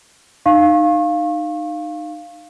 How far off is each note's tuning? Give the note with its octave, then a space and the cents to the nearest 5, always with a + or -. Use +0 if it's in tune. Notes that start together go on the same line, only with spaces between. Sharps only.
D#4 -25 F5 +0 C#6 -35